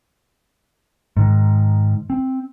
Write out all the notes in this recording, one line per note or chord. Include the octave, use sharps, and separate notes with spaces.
G#2 D#3
C4